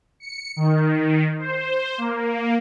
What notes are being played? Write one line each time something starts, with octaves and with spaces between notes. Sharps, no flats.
C#7
D#3
C5
A#3